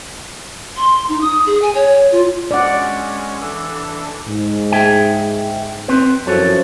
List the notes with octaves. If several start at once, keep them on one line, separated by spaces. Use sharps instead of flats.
C6
D#4
D#6
G#4
G#5
C#5
F4
G#3 C#4 D5 F#5
E3 D4 A4
G#2
G#4 E5 G5
C4 B4
F#2 E3 F3 F#4 A4 C#5